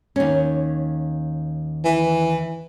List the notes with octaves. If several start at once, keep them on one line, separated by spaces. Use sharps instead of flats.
D#2 C#4
E3